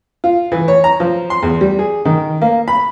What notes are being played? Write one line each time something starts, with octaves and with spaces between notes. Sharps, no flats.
F4
E3
C#5
A#5
F3
C6
E2
G3
G#4
D#3
A#3
B5